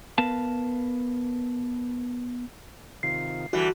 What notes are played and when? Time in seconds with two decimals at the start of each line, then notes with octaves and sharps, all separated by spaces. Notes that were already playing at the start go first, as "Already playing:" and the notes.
0.18 B3 A#4 B4 F5 A5
3.03 C3 D#3 F4 C7
3.53 D3 E3 G3 F#4